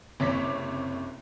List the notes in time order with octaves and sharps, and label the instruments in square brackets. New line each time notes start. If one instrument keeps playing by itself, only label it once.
[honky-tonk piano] F#1 C3 C#5 D6 B6